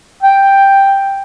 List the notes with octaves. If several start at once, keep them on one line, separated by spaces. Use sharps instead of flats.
G5